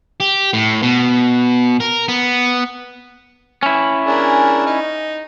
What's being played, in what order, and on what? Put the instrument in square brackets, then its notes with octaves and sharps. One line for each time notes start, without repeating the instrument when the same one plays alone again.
[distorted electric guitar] G4
A2
B2
A#4
B3
[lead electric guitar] C#4 E4
[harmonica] D4 G#4 A#4
D#4